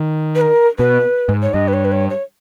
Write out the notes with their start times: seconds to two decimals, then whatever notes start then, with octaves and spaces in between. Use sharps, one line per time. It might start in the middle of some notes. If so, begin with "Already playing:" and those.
Already playing: D#3
0.35 B4
0.41 A#4
0.78 B2 B4
1.29 G#2
1.42 C#5
1.53 G2 D#5
1.68 B4
1.73 C#5
1.85 B4
1.92 C#5
2.10 C#5